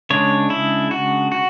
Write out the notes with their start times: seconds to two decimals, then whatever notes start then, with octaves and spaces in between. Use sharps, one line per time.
0.10 C#3 G#3 D4 C#5
0.50 E4
0.91 F#4
1.32 F#4